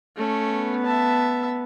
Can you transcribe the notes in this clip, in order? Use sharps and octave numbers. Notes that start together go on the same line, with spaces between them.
A3 C#4
B3
E5 A5